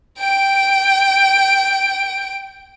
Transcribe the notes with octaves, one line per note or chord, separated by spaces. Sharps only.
G5 D7